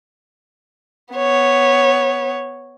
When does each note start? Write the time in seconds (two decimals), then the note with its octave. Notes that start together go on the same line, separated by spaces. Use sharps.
1.15 B3 C#5